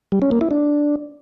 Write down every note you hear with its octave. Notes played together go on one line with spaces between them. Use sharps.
G3
C#4
A#3
E4
D4